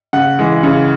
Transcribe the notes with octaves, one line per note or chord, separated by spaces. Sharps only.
C#3 F#5
E3 G#3
C#3